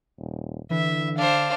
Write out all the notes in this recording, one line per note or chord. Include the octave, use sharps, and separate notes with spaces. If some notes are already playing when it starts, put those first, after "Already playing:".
D#1
D3 E3 E5
D4 C5 F5